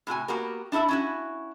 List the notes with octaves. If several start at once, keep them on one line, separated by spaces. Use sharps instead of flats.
A2 C3 F#4 G#5
A#3 B3 F#4 G4 A#4
D4 E4 A4 E5
C#4 E4 F#4